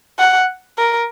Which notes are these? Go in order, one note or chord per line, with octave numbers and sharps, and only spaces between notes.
F#5
A#4